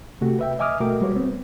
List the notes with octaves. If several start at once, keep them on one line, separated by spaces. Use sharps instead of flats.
C3 A3 F#4 G4
B4 E5 G5
D#5 E5 G#5 D6 D#6 F6
B2 A3 F#4 A#4 G5 D6
G3 G#3 F#4 B4 C#5
B3 C4